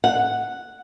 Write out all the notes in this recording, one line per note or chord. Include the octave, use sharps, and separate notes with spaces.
F#5